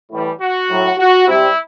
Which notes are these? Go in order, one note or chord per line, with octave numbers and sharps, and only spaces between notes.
A2 E3 G3
F#4
A2 F#3
F#4
C3 G3 E4